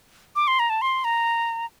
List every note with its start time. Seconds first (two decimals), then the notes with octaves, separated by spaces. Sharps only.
0.36 D6
0.47 C6
0.59 A#5
0.70 A5
0.81 C6
1.04 A#5